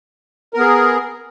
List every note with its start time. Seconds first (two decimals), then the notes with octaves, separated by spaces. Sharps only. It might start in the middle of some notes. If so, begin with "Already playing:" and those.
0.54 A#4
0.57 B3
0.60 G#4